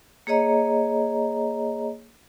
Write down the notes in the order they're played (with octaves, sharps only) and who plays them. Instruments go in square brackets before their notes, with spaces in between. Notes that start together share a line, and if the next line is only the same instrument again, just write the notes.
[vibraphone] A#3 G#4 C#5 D#5 A#5